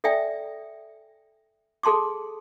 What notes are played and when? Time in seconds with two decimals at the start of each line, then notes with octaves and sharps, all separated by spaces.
0.04 A4 D5 E5 G5 G#5
1.83 G#4 A4 A5 C6 D6